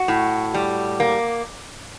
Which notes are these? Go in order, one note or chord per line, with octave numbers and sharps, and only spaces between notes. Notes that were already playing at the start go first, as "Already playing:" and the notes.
Already playing: F#4
A2
G3
A#3